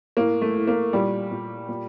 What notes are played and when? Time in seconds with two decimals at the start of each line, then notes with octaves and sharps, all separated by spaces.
0.17 A2 A#3
0.42 A3
0.55 A2
0.67 A#3
0.93 A#2 G3 G4
1.31 A#2
1.69 A#2